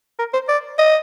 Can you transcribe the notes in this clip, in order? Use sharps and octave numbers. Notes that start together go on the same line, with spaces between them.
A#4
C5
D5
D#5